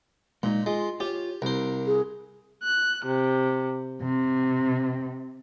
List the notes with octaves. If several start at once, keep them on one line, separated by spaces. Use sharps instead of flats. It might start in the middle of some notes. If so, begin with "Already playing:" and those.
A#2 G#3 D#4
G#3 F4
F4 G4 C#5
C2 A#4 C5
G#4
F#6
C3
C3